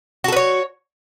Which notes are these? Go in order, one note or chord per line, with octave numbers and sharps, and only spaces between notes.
F#4 A4 B4 C#5